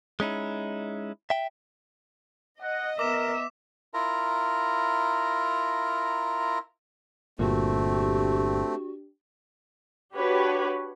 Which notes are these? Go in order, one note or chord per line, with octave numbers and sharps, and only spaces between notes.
G#3 C#4 D#4 E4
E5 G5
D#5 F#5
B3 A#4 E5 D6 E7
E4 F4 A#4 A#5
G1 A#2 A3 C4 D4 F#4 G4
D4 F#4 G4 B4 C#5